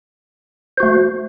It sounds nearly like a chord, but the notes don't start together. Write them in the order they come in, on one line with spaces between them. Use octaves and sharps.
C5 F#4 A3